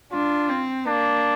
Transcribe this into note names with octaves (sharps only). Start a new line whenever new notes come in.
D4 F4
C4
A#3 D4